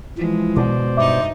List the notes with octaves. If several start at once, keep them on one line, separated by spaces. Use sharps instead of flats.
E3 F3 G#3
B2 C5 D5
G2 D#4 E5 D6